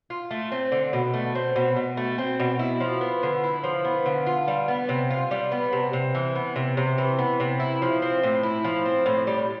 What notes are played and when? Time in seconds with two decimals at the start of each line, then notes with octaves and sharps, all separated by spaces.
0.10 F4
0.31 A3
0.52 C4
0.72 D3
0.93 B2
1.14 A3
1.35 C4
1.56 B2
1.76 B2
1.97 A3
2.18 C4
2.40 B2
2.59 E4
2.80 F3
3.01 B3
3.23 D3
3.44 E4
3.64 F3
3.85 B3
4.06 D3
4.26 F4
4.48 G3
4.68 B3
4.89 C3
5.10 F4
5.31 G3
5.51 B3
5.73 C3
5.93 C3
6.15 E3
6.36 B3
6.56 C3
6.77 C3
6.98 E3
7.18 B3
7.40 C3
7.60 E4
7.82 F3
8.02 C4
8.23 A2
8.43 E4
8.64 F3
8.86 C4
9.06 A2
9.27 G3